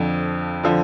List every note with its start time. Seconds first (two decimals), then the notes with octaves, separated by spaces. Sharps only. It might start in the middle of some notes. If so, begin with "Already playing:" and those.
Already playing: F2 D3 F3
0.63 D3 F3